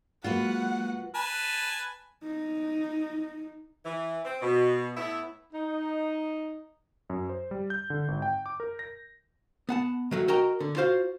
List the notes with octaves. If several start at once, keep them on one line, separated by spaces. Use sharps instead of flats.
F#3 G#3 A#3 F4 F#4 B4 F#5
B4 G#5 A5
D#4
E3
C4
B2
A2 B3 E4
D#4
F#2
C5
G3
G6
D3
G#1
G5
D6
A#4
A#6
B3 F#5 A5
D#3 F#3 A3
F#4 A#4 D#5 G5 A#5
D3
F4 F#4 C5 F5